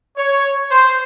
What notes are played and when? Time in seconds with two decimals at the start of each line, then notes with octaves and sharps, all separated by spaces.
0.17 C#5
0.71 C5